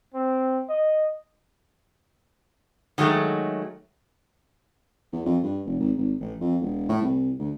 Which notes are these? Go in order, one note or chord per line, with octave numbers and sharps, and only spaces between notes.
C4
D#5
D#3 F#3 G#3 A3
E2
F2
G2
F1
G#1
G#1
A1
F2
E1
A2
C2
D2